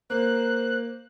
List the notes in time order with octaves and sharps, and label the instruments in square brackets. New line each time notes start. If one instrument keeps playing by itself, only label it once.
[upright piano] A#3 [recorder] C5 [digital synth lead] F#6